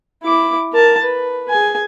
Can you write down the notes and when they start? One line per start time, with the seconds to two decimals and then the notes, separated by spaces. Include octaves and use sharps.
0.24 E4 D6
0.73 A#4 A5
1.04 B4
1.50 G#4 G#5